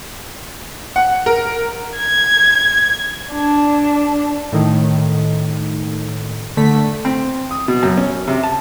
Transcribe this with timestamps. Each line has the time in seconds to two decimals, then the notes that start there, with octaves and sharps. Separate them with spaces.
0.96 F#5
1.26 A#4
1.98 G#6
3.33 D4
4.53 A2 D#3
6.57 D3 A3 B6
7.05 C4
7.51 D#6
7.68 B2
7.83 F#2
7.97 C#4
8.27 C3
8.43 A5